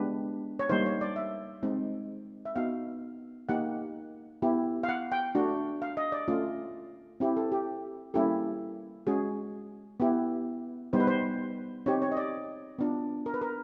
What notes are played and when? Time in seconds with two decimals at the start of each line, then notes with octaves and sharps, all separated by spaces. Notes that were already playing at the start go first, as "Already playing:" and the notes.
Already playing: G#3 B3 D4 G4 B4
0.59 C#5
0.69 G3 A#3 D#4 C5
0.86 C#5
1.01 D5
1.16 E5
1.63 G#3 C4 D#4
2.45 E5
2.56 B3 D#4 F#4 F5
3.49 A#3 D#4 G4 F#5
4.42 B3 E4 G4
4.83 F5
4.89 F#5
5.12 G5
5.35 A3 D4 F#4
5.82 F5
5.97 D#5
6.12 D5
6.28 A3 C#4 F4
7.20 C4 E4 G4
7.37 A4
7.52 G4
8.14 G3 A#3 C#4 E4 G4 A4
9.07 G#3 C#4 F#4 G#4
10.00 B3 E4 G4
10.93 G3 B3 D#4 C5
11.00 B4
11.07 C5
11.86 C4 D#4 G4 C#5
12.02 C#5
12.12 D#5
12.17 D5
12.79 B3 D4 F4
13.26 A#4
13.34 B4
13.41 A#4